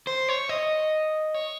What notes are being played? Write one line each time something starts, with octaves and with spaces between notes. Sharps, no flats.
C5
C#5
D#5
C#5